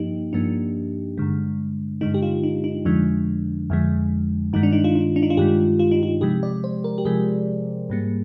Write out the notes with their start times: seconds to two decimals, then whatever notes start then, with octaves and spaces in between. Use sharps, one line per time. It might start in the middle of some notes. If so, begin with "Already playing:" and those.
Already playing: G2 F3 A#3 D#4 G4
0.33 G2 F3 A#3 D4
1.18 G2 D3 G#3
2.01 G2 D3 G#3 D#4
2.14 G4
2.22 F4
2.43 D#4
2.64 D#4
2.85 F2 D3 F3 G#3 D4
3.70 F2 D3 F3 G#3
4.53 G2 D#3 G#3 D#4
4.63 D4
4.73 D#4
4.84 F4
4.95 D#4
5.16 D4
5.23 D#4
5.30 F4
5.37 G2 D#3 G#3 G4
5.79 F4
5.91 D#4
6.03 F4
6.21 C3 F3 G#3 G4
6.43 D5
6.64 C5
6.84 A#4
6.98 G4
7.05 C3 F3 G#3 G#4
7.90 G#2 G3 A#3